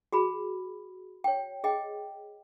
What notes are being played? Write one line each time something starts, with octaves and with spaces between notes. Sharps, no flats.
F#4 G#4 B5
C#5 G5
G#4 D#5 G5